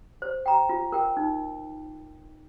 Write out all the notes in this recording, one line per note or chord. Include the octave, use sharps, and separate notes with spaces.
C5
G5 A#5
F4
A#4 G5
D#4